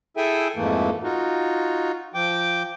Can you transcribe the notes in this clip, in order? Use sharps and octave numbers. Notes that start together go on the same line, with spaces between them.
E4 G#4 A4 E5 G5 G#5
F2 G#2 E3 A3 A#3
D#4 F4 F#4
F3 G5 D6